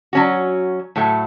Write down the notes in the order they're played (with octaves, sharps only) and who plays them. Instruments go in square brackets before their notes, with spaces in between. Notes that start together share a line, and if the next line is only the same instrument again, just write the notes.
[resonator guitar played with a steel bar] F#3 C#4 F#4
A2 F#3 A3